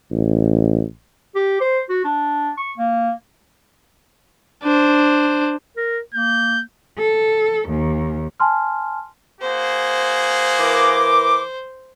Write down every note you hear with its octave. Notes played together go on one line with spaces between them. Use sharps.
A1
G4
C5
F#4
D4
C#6
A#3
D4 C5
A#4
A#3 G6
A4
D#2
G#5 A5 C6 F6
A#3 F#4 G#4 C5
E3 A#4 D6